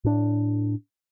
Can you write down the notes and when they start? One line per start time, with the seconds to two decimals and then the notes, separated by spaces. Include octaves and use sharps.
0.04 A2 D4